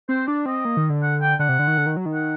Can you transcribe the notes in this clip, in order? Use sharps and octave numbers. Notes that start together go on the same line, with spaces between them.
C4 C5
D4 D5
C4 D#5
A#3
D#3
D3
F#5
G5
D3 F#5
C3
D3
D#3
D3
D#3
F#3
D#3
F#5